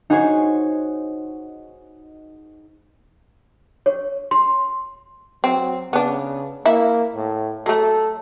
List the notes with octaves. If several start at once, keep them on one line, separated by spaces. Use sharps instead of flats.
D#4 F#4 G#4 C5 C#5
C#5
C6
F#3 C4
C#3 B3 D4
A#3 E4
A2
F#3 A3 A4